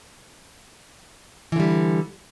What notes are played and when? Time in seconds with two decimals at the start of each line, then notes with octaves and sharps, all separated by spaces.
1.52 E3
1.56 D3
1.60 G3